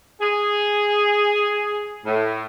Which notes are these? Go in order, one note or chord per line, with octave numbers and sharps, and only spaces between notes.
G#4
A2